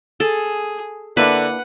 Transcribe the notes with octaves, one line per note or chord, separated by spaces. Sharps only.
G#4 A4
D3 A#3 D4 E4 B4 F#5